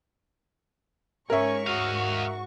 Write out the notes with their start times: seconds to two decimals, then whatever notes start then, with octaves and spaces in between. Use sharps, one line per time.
1.30 G#2 C#4 A#4 E5 C#6
1.67 F#4 D#5 F5